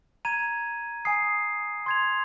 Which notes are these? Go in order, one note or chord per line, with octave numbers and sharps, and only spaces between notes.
A#5 G#6 D#7
G#5 D#6 C7
C6 G#6 F7